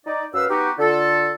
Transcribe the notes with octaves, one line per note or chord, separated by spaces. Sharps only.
D#4 D5
F#2 B4 F5 E6
B3 D#4 F#4 G4
D3 F4 A4